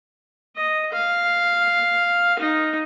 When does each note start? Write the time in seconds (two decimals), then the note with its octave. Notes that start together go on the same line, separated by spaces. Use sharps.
0.56 D#5
0.92 F5
2.39 D#4